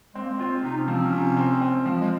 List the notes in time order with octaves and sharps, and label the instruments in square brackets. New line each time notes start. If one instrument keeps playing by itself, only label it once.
[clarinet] G#3 [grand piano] C4
[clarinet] A#3
G#3
[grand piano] C4 [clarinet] F4
[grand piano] C3 [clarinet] D#4
[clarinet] C#4
[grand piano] F3 [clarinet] C4
[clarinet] C#4
[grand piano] C3
C4
C4
F3
[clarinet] G#3